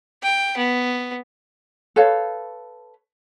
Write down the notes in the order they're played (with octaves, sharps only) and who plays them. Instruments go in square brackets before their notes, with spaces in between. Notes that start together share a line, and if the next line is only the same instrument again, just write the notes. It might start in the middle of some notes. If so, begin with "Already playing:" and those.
[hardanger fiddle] G5
B3
[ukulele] A4 B4 C#5 F5